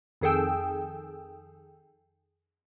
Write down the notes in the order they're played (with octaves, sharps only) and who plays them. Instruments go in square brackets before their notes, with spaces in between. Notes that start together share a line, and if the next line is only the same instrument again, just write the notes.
[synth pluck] F2 D#3 G#4 A4 G5 E6